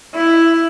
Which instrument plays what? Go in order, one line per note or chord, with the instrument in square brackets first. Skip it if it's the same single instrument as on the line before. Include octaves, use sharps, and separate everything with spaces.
[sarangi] E4